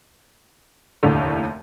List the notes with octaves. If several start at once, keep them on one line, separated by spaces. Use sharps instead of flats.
F1 D#2 A2 D3